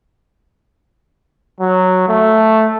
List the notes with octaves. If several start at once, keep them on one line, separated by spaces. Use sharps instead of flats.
F#3
A3